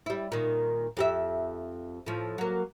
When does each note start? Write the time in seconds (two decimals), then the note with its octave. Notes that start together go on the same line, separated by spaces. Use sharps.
0.06 G3 E4
0.32 A#2 D#3
0.97 F2 G4 E5
2.06 A2 F3
2.38 F#3 A#3